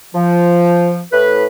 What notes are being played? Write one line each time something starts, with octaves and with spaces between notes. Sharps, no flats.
F3
A2 B4